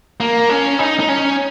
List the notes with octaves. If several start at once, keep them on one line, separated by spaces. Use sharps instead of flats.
A#3
C#4
D#4
D#4
C#4